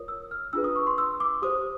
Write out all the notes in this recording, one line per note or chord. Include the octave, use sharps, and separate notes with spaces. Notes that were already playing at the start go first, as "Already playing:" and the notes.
Already playing: F4 A#4 C#5 D#6
E6
F6
D4 F4 G#4 B4 E6
D#6
C#6
C6
E6
D6
G4 C5 D#6